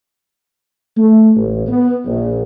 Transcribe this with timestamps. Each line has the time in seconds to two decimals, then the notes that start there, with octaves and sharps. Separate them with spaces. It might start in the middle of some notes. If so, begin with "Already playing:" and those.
0.97 A3
1.36 A1
1.67 B3
2.06 A#1